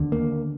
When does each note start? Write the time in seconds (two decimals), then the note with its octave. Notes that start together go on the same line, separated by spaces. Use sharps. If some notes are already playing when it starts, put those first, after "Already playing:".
Already playing: D#2 D3
0.12 A#3